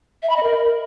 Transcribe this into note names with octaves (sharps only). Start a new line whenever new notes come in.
E5
B5
D#5
A#4